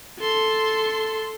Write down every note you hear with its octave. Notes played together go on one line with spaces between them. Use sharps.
A4 C6